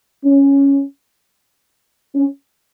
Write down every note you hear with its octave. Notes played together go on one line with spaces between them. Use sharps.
C#4
C#4